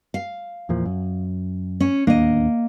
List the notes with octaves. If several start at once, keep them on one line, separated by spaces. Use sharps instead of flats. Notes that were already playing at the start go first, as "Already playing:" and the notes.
F5
E2 A#2 F3
F#2
C#4
D1 D#2 A#3 D4 D#5